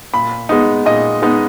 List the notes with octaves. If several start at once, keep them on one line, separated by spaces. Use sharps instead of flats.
A#2 B5
G#3 B3 D#4
A#2 D#5
G#3 B3 D#4